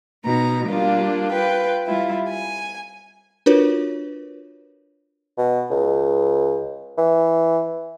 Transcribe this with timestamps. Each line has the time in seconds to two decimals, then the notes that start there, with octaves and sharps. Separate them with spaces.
0.24 B2 D#4 A#5
0.68 G3 A#3 D4 F4
1.32 F4 B4 G5
1.86 G3 E4 F4
2.28 G#5
3.46 D4 F4 F#4 A#4 B4 C#5
5.38 B2
5.70 C#2
6.98 E3